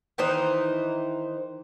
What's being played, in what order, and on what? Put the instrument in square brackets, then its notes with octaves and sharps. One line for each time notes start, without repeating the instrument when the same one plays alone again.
[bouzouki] D#3 E3 D#4 C5